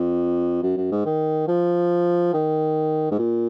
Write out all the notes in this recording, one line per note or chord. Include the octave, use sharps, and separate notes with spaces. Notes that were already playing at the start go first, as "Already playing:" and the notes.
Already playing: F2
F#2
F#2
G#2
D#3
F3
D#3
G#2
A#2